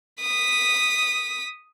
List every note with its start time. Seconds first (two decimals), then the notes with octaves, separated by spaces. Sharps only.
0.21 D#6 B6